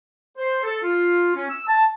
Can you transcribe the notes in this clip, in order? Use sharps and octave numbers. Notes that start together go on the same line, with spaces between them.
C5
A4
F4
C#4
E6
A5